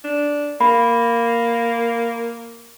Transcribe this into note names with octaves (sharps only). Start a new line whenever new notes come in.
D4
A#3 B5